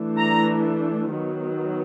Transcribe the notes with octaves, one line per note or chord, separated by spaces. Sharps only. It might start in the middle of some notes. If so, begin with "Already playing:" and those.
Already playing: E3 A3 D4
A#5
D#3 F#3 B3